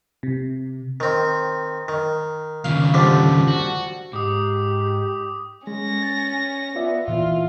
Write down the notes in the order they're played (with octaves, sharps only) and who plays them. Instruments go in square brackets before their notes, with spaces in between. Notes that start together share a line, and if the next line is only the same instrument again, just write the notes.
[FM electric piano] C3
[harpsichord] D#3 C4
D#3
[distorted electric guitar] D#2 C#3 [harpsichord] F5
[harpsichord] D3 F3 G3
[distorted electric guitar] F#4
[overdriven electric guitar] G#2 [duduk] G4 [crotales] D6 D#6
[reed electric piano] G#3 [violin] C#4 A#6
[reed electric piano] A6
[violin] B3 [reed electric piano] F4 D5 E5
[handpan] A#2 E3 [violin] F4 [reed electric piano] E5